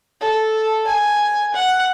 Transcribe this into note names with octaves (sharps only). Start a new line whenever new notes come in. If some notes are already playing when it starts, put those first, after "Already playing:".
A4
G#5
F#5